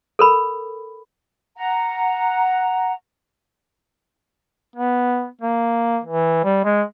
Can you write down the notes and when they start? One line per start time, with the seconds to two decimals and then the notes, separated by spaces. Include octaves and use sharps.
0.19 A4 A#4 B5
1.55 F#5 A#5
4.76 B3
5.41 A#3
6.04 E3
6.45 G3
6.65 G#3